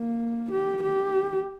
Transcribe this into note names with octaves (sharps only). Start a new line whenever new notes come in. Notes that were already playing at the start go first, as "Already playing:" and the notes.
Already playing: A#3
G4
G4